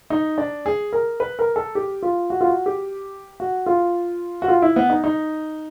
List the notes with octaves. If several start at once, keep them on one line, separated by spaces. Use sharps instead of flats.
D#4
D4
G#4
A#4
B4
A#4
A4
G4
F4
F#4
F4
F#4
G4
F#4
F4
F#4
F4
E4
B3
D#4
D#4